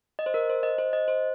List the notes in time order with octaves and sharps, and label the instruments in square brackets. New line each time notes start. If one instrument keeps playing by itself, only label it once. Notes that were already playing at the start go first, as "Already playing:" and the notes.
[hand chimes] D#5
C5
A#4
C5
D#5
C5
D#5
C5